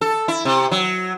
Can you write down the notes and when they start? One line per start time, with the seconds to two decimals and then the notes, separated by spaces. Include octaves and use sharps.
0.01 A4
0.28 E4
0.45 C3
0.71 F#3